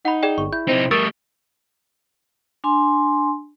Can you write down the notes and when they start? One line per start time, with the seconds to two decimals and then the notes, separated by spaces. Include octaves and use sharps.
0.05 D#4 F#5 B5
0.23 G#4 D5 G5
0.38 G1 C#6
0.53 E4 G6
0.68 C3 C4 D#4
0.91 G3 A3 A#4 C#6 D#6 E6 A6 D7
2.64 D4 G#5 C6